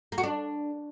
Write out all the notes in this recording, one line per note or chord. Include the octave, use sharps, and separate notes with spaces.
A#3
F#4
D4